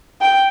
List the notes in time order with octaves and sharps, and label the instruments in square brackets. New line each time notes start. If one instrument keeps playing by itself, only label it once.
[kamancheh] G5